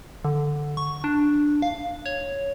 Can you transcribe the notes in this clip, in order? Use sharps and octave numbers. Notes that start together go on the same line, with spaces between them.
D3
C#6
D4
F5
C#5